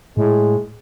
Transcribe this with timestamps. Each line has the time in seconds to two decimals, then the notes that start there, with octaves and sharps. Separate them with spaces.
0.17 A2 G#3